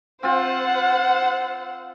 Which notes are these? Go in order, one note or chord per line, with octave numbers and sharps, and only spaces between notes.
C4 F4 C5 F#5